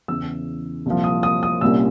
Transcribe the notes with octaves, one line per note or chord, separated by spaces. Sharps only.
E2 C#3 E3 E6
C2 A#2 F3
D#6
D#6
D#6
C2 A#2 G3 A#3 C#4 E6